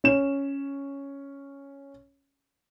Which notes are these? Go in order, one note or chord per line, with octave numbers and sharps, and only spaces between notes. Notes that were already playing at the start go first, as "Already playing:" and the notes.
C#4 E7